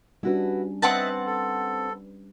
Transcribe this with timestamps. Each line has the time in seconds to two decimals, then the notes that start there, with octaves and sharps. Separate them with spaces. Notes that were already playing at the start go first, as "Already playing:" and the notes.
0.23 G3 C#4 D4 E4 F#4 B4
0.82 C4 B4 D#5 E5 F#5 A5
1.26 A4